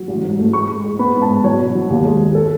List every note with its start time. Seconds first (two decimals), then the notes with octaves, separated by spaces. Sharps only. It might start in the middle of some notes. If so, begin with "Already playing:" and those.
Already playing: F#3
0.08 A1
0.23 G#2
0.39 A3
0.53 G#3 C#6
0.69 G#3
0.84 G#3
0.99 B3 B5
1.15 G#2
1.22 A5
1.30 G#2
1.44 F#3 C#5
1.59 B2
1.75 F#3
1.90 D#2
2.05 G#3
2.20 G#3
2.35 A4